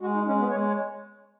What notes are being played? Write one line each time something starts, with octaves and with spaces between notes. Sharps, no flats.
G#3 F#4
D#4
G#3 C#4
B3
G#3 C#5
C#5